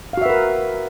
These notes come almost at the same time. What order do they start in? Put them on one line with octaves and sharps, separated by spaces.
F5 F#4 E5 B4 A#4